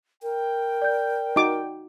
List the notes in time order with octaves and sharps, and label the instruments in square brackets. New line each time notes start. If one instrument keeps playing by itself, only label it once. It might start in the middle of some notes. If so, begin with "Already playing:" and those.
[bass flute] A#4 [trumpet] G5
[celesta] D5 G6
[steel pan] D#4 F#4 D6